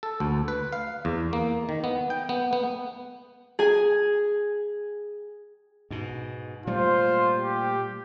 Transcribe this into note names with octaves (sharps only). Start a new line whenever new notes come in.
A4
D2
B4
F5
E2
A#3
D#3
B3
G5
B3
B3
G#4 G#5
G#2 B2
A#2 G3 A3 F4 C5
G4